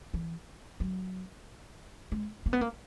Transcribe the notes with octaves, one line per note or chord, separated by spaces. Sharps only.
E3
F#3
G#3
A#3
B3
A#3